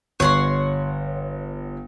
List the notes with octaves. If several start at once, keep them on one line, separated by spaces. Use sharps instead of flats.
G1 C#5 F#5 C6